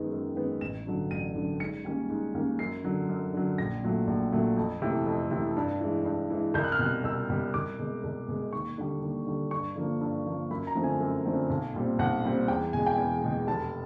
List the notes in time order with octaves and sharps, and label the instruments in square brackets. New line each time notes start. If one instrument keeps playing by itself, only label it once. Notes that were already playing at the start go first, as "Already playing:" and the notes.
Already playing: [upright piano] F#2 D#3 G#3 B3
F#2
D#3 G#3 B3
A1 E7
G2 D3 F#3
A1 D#7
G2 D3 F#3
G#2 C#7
D#3 G3 A#3 C#4
G#2
D#3 G3 A#3 C#4
F#2 C7
D3 F#3
F#2
D3 F#3
A#1 A#6
A#2 F#3 A3
A#1
A#2 F#3 A3
F2
C3 E3 A3
F2
C3 E3 A3
G2
E3 G#3
G2
E3 G#3
C2 G6
F#6
F6
B2 G3 F#6
C2 E6
B2 G3
C2 D6
B2 G#3
C2
B2 G#3
D#2 C#6
D3 G3
D#2
D3 G3
G2 C#6
D3 F3 A#3
G2
D3 F3 A#3
F#2 B5
A#5
D3 F3 A3 C4
G#5
F#2
D3 F3 A3 C4
B1
A#2 G3 C4
B1 F#5
A#2 G3 C4
E2 G5
B2 G#3 G#5
G5
E2 G#5
B2 G#3
F1 A5